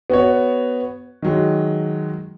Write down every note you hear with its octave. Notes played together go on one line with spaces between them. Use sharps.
B3 F#4 C#5
D#3 F#3 G#3